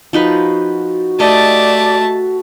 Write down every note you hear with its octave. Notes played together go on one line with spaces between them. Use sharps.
F3 D#4 F#4 B4
A3 G4 D5 D#5 A5